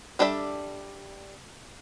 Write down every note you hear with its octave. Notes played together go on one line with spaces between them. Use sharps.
G3 D4 A4 A#4 E5